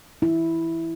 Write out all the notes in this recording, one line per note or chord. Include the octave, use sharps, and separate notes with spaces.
E4